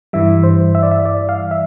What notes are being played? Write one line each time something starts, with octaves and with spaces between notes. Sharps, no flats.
G2 E3 G3 E5
C5
E5
D5
E5
D5
F5
E5